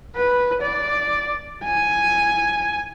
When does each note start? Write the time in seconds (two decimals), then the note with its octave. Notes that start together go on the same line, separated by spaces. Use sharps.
0.16 B4
0.61 D5
1.64 G#5